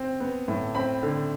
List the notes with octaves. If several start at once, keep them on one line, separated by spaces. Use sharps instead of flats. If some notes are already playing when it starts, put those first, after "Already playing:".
Already playing: C4
B3
A2
C4 B5
D3